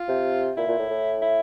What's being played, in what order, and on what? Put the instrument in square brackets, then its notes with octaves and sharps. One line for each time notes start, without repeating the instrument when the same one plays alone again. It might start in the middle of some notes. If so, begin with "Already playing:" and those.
Already playing: [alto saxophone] F4
[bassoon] C3
[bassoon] A#2 [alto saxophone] E4
[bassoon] A#2
A2
A2
[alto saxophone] E4